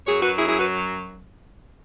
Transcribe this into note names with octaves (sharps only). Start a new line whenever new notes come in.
F#2 F#3 G#4 C#5
F#4 B4
E4 G#4
E4 G#4
F#4 B4